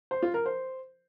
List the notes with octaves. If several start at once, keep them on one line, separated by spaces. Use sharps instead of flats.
C5
F4
A#4
C5